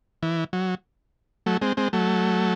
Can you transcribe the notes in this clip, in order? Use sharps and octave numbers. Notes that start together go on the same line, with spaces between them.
E3
F#3
F#3 A3
G#3 C4
G#3 C4
F#3 A3